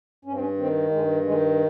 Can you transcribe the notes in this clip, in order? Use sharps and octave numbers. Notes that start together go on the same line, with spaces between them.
G2 C#4
C4
C#4
D#3 C4
G2 G#3
D#3 G#3